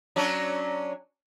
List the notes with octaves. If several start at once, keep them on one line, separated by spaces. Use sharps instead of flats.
F#3 C#4 D4